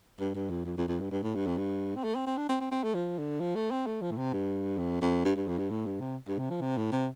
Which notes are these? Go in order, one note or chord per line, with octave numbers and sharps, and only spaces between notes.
G2
G2
F2
F2
F2
F2
G2
G2
A2
G2
F2
G2
C4
A3
C4
C4
D4
C4
C4
C4
A3
F3
D3
F3
A3
C4
A3
F3
A2
C3
G2
F2
F2
G2
G2
F2
G2
A2
G2
C3
G2
C3
F3
C3
A2
C3